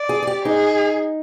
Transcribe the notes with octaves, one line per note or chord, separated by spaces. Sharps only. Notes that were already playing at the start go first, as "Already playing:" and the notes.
Already playing: D5
G#4
G#4
G4
D#4 G#4